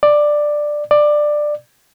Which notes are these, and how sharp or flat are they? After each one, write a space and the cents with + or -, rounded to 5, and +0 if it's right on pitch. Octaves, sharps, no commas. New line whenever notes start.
D5 +10
D5 +15